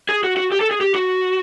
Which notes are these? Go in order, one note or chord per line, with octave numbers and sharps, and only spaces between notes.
G#4
F#4
F#4
G4
A4
G#4
G4
F#4